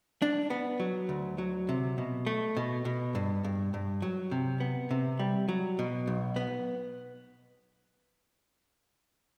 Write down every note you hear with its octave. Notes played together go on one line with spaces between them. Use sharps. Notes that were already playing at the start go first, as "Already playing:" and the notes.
D4
B3
F#3
D2
F#3
C3
B2
A3
B2
B2
G2
G2
G2
F#3
C3
B3
C3
G3
F#3
B2
B1
B3